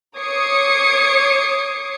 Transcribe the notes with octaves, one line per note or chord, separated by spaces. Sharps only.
C#5 D6 D#6 G#6 C7 C#7